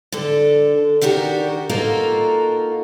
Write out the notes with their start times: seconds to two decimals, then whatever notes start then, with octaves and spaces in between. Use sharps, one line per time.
0.12 D3 D4 A4
1.01 D#3 D4 F#4 G4 A#4
1.69 A#3 D#4 F4 F#4 A4 A#4